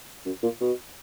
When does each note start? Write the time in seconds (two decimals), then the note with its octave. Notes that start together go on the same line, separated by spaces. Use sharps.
0.26 F#2
0.43 A#2
0.61 B2